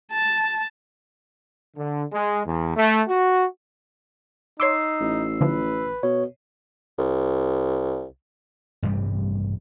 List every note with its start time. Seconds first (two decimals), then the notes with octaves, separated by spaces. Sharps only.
0.12 A5
1.77 D3
2.12 G#3
2.46 E2
2.77 A3
3.08 F#4
4.60 D#4 C#5 C6 D6 E6 C7
5.01 A1
5.41 D3 E3 F3 B4
6.03 B2 C#5
6.98 C2
8.83 A1 G2 C3 G3